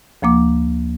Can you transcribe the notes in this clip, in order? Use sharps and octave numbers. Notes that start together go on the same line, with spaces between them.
D2 F3 A#3 D6